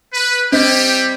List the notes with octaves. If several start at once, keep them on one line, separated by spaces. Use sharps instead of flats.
B4
G3 C4 E4 G4 C5 D#5